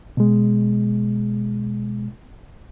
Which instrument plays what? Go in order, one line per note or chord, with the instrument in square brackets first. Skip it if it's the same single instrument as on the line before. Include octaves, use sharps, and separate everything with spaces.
[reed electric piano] B2 G#3